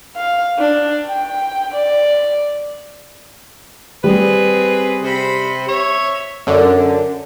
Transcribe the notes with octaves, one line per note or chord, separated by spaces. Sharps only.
F5
D4
G5
D5
G3 C4 G#4 B4
C3 C5 B5
C#5 E5
F#2 D3